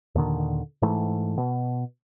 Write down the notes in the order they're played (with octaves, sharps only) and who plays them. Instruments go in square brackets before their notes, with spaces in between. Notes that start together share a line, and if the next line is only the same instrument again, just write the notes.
[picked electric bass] D#2 A#2 D3 D#3
G#2 E3 A3
B2